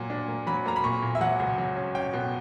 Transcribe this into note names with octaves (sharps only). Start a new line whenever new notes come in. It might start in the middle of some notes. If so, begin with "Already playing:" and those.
Already playing: A#2 F#3
D4
A#3
F#3 B5
A#3 A#5
B5
A#2 C#6
A#2
E5
F#3 F#5
C#2
F#3
C#4
C#4 G5
B2